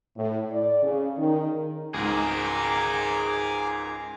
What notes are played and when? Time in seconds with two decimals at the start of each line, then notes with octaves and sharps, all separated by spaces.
0.16 A2
0.51 D5
0.83 C#3
1.18 D#3
1.94 C#2 G#2 G#4 A#4 G#5 A#5 D6